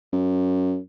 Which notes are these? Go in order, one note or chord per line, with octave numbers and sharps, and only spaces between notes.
F#2